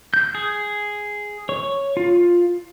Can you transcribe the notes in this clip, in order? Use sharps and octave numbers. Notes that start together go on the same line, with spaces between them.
G6
G#4
C#5
F4